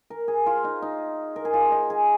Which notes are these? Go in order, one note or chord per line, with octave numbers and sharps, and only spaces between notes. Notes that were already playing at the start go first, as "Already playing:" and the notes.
A#4
G#4
F4
D#4
D#4
A#4
G#4
F4
D#4
G#4